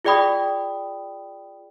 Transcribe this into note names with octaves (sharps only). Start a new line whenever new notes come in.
F4 G#4 D5 G5 B5 D#6